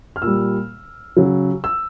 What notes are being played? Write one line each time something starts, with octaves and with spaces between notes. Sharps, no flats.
F6
A#2 G3 E6
C#3 F#3
E6